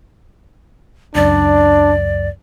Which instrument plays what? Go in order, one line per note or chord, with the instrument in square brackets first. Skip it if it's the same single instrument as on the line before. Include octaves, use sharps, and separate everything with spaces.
[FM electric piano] C#2 F#2 [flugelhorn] D4 [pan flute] D5